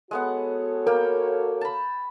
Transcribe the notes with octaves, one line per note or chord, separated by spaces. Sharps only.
G#3 B3 F#4 A4 C#5 F#5
A#3 A#4 G5
A5 B5